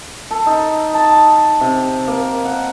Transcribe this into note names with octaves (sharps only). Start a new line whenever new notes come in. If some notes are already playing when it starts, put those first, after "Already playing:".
A4
D#4
A5
C3
A#3
F#5